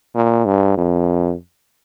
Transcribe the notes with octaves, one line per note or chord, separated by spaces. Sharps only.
A#2
G2
F2